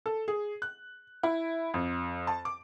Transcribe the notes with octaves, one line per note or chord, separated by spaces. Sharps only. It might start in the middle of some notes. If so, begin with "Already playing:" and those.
A4
G#4
F#6
E4
F2
A5
D6